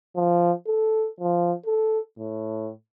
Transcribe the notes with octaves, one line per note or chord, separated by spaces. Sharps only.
F3
A4
F3
A4
A2